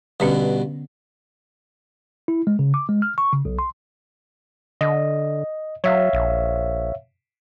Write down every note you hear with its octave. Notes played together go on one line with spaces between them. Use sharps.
G2 B2 D3 B3 C#4
E4
G#3
C#3
D6
G#3
F6
C#6
C#3
B1
C6
D3 D#5
F#3 C#5 E5 F5
A#1